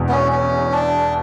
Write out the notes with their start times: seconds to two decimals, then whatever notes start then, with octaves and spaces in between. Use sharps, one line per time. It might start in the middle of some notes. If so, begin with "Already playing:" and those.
Already playing: E1 E2 B2
0.09 B3
0.12 C#4
0.32 C#4
0.72 D4